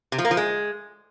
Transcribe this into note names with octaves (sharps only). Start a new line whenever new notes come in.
C3
F3
A#3
F3
G#3